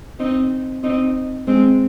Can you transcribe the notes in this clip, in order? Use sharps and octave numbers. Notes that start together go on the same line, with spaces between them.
C4 D#4
C4 D#4
G#3 C4